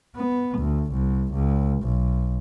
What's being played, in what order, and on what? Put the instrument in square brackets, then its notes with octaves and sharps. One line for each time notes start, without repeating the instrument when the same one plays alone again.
[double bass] B3
D2
C2
C#2
B1